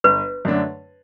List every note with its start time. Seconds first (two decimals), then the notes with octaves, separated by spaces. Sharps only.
0.04 G1 B4
0.45 F#2 D3 A3 D4